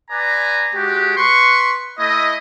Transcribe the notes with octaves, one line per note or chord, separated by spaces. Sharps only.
B4 D5 G#5 A#5
G#3 F#4 G4
B4 C6 C#6
A3 E4 D#5